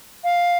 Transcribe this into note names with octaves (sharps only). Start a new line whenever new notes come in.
F5